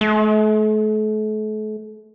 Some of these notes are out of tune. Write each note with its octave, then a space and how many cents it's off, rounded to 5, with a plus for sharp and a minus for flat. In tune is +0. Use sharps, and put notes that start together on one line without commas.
A3 -40